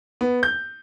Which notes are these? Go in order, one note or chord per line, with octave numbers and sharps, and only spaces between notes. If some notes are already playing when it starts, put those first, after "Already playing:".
B3
G6